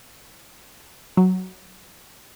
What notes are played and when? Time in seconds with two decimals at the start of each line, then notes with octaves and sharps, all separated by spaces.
1.17 F#3